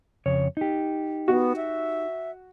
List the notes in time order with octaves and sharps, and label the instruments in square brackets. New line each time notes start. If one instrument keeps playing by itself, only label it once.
[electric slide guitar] F2 C#3 C#5
D#4 G4
[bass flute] B3 [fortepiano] F#4
[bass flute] E5